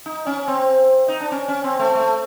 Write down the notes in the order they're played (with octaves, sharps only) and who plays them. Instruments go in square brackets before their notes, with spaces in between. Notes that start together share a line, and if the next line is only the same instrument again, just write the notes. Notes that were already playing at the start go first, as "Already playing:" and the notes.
[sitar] D#4
C#4
C4
D#4
D4
C#4
C#4
C4
A3
A3